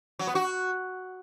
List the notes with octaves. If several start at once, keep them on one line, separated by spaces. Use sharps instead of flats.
F#3
B3
F#4